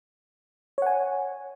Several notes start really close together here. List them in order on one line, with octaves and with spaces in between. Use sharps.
C#5 F#5 G#5